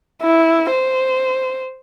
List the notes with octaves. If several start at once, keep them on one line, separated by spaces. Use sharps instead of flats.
E4
C5